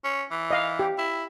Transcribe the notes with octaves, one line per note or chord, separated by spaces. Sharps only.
C#4
E3
D#5 F5
G4
E4